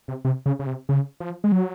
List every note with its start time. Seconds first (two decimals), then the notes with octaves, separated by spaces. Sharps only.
0.08 C3
0.25 C3
0.46 C#3
0.59 C#3
0.67 C3
0.89 C#3
1.20 F3
1.44 G#3
1.52 F#3